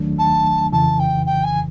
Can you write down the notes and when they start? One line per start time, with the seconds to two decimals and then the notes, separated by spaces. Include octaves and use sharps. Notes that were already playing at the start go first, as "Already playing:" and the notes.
Already playing: D#2 D#3 F#3 A3 D4
0.19 A5
0.72 F2 C#3 E3 A5
0.99 G5
1.26 G5
1.44 G#5